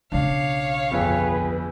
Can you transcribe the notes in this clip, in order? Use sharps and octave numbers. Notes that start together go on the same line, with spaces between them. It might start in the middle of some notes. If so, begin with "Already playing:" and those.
B1 C#3 D4 C#5 F5
G1 F2 G#4 B4